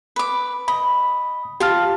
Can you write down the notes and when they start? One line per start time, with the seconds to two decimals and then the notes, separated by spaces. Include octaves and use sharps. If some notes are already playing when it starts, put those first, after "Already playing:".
0.16 B4 D6
0.68 D#5 B5
1.60 F4 G4 A5 F6